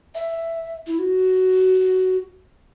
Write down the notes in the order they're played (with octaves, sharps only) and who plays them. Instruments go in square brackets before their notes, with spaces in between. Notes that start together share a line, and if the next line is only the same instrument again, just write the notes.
[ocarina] E5
E4
F#4